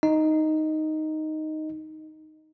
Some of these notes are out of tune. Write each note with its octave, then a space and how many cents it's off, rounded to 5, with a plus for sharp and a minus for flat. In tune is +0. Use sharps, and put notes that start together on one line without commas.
D#4 +0 D#5 +0